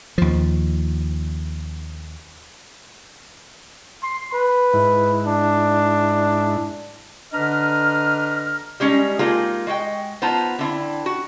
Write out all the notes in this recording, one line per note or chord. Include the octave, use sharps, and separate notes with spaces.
D#2 F3
C6
B4
G#2 E4
D4
D3 D4 B4 D#5 A#5 F6
G3 G#3 C#4 D#4
G#3 A#3 C4 D#4 F4 G#4
G#3 F#4 D#5 G5
B3 D#4 F4 C5 A5 A#5
D3 C4 E4
F#4